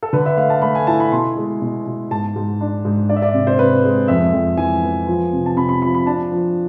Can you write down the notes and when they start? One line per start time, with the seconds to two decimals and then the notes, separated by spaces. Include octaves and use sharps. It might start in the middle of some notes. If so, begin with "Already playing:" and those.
0.03 A4
0.13 D3 B4
0.26 E5
0.37 A3 F5
0.50 A5
0.62 A3 B5
0.75 G#5
0.87 E4 A5
1.00 B5
1.12 B2 C6
1.36 G#3
1.62 B2
1.86 B2
2.11 G#2 A5
2.36 G#2
2.61 D4
2.85 G#2
3.09 D4 D5
3.16 E5
3.22 D5
3.34 C3
3.47 C5
3.59 C3 B4
3.83 G#3
4.08 F2 E5
4.33 F2
4.57 E3 G#5
4.83 B3
5.07 F3
5.33 C3
5.46 A5
5.57 C3 B5
5.69 B5
5.82 F3 B5
5.94 B5
6.06 D4 A5
6.32 F3